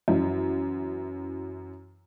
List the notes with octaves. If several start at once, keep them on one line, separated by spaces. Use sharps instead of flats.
F#2 E3